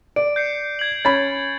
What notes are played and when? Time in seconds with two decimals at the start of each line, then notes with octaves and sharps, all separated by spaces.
0.16 D5 D7
0.36 G6 C7 C#7
0.79 G#6 F#7
1.05 C#4 B5 A6